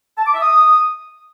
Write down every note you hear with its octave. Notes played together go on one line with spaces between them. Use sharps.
A5
D6
E5
D#6